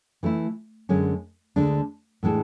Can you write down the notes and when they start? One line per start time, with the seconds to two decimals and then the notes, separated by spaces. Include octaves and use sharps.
0.23 E3 A3 E4
0.89 F#2 D3 G#3 C#4
1.56 D2 D3 G#3 D4
2.23 A2 E3 G#3 D4 A4